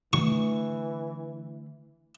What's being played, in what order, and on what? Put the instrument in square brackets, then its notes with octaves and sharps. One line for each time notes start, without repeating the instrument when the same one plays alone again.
[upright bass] D3 A3 [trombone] E3 [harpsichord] C#6